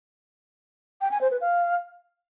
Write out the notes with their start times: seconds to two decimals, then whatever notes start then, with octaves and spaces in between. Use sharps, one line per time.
1.01 G5
1.11 G#5
1.21 C5
1.31 B4
1.41 F5